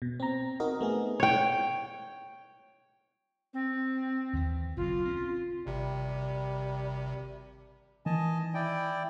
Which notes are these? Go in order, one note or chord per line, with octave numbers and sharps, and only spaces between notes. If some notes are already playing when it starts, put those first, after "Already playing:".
B2
C4 A#5
C4 D#4 F#4 A#4 D#5
A3 B3 G#4
C#5 G5
C4
D#2 D#3 E3
F#1 B1 F4
C4 C#4
G#1 C3 G3
D#3 E3 D#5 G#5 A5
E4 D5 G5